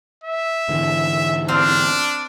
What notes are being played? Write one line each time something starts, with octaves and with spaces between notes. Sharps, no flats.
E5
G#2 D3 E3
C4 D4 F5